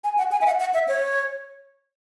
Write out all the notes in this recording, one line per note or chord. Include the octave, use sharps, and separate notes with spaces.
G#5
F#5
G#5
E5
F#5
F#5
E5
C#5